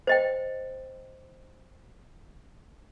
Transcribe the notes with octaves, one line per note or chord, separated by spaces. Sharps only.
C5 D#5 G5